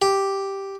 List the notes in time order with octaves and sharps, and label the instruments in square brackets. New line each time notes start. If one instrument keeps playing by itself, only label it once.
[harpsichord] G4